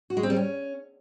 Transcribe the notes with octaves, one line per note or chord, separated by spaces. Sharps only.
F#4
G#3
C4
G3
C#4